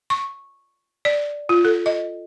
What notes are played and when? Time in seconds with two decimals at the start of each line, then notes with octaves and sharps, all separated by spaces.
0.10 C#6
1.05 D5
1.49 F4
1.65 A4
1.86 D#5